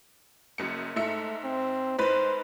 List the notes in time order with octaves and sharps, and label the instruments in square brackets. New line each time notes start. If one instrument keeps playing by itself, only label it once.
[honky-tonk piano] F#1 F#2 C#7
[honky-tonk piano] G#2 E5 C#7 [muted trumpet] A3
[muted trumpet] C4
[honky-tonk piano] G#2 B4 B5 [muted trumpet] C5